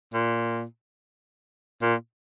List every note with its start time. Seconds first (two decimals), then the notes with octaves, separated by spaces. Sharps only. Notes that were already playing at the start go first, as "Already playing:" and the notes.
0.14 A#2
1.82 A#2